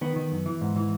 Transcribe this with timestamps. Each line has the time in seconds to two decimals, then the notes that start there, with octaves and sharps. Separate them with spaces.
0.01 D#3 B3
0.16 D#3
0.32 F#2
0.46 E3
0.61 G#2
0.76 E3